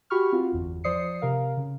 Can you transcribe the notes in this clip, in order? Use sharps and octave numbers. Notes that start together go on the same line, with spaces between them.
F#4 G4 B5 C#6 F6
C4 F4 F#4
G1 E2
F3 C5 D5 D#6 C7 C#7
C3 A#4 F5
C#3